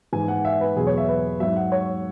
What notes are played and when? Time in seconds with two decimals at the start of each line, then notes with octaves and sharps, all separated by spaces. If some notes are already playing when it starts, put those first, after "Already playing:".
0.13 G#2 E3 G#5
0.28 F#5
0.45 E5
0.61 B4
0.76 E2 B2 F#3 G#4
0.87 C#5
0.98 E5
1.08 B4
1.40 G#2 F#3 E5
1.56 F#5
1.72 C#5